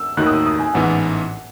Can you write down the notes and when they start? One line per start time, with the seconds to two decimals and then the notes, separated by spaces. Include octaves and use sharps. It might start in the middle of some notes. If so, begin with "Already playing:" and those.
Already playing: E6
0.17 D#2 D#3 A3 D#4 F#4 F#6
0.26 D#6
0.31 E6
0.46 D#6
0.59 G#5
0.73 A1 G#2 E3 B3 F#5